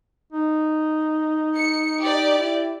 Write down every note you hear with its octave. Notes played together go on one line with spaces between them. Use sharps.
D#4
C#7
G4 D5
E4